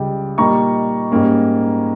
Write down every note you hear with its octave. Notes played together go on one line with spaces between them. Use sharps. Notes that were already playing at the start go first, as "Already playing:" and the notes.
Already playing: C#2 C#3 G3 G5
A#2 G3 A#3 D#4 A#5 C#6
G#2 G3 A#3 C#4